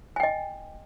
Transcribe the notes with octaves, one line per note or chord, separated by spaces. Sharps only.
D#5 G5 G#5